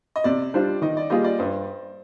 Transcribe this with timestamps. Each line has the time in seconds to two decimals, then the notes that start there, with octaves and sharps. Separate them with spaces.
0.16 D#5
0.24 C3 D5
0.54 G3 D4 F4 C5
0.82 D#3 D#5
0.97 D5
1.10 G3 A#3 F4 G#4 D#5
1.24 D5
1.39 G2 C5